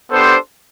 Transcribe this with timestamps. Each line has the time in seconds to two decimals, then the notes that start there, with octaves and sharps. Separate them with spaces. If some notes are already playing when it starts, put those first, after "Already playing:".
0.10 B3 D4 G4 A4 C5